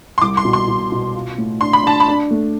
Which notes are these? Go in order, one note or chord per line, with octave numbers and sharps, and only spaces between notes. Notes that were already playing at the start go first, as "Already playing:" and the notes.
C6
C2 D6
C6
B2
C6
B2
B2
F4
A2
D4 C6
B5
D4 A5
B5
D4
A3